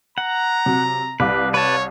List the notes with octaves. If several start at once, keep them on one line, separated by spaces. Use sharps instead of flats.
F#5 A#5
C3 F#3
C2 B4 F5 D6
B4 C#5 A5